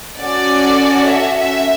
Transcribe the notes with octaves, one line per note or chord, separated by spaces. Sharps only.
C#4 F#4 A4 D5
E5
E5